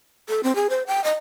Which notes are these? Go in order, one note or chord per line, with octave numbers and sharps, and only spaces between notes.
A4
C4
G#4
C5
G5
D#5